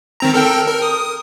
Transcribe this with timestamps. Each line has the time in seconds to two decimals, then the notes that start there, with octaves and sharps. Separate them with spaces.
0.20 D#3 C4 A#5
0.34 A4 A#4 G5
0.67 A#4
0.82 D#6